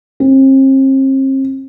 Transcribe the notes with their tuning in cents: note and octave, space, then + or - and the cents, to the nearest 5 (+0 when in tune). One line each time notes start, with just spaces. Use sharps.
C4 +40